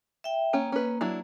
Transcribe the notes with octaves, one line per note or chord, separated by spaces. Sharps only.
E5 G5
A#3 C#4 G5
C#4 B4
F#3 D4 E4